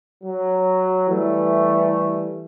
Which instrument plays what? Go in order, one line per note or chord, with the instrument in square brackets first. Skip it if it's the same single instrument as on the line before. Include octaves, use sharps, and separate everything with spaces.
[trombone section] F#3
[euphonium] E3 [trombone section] G3 A3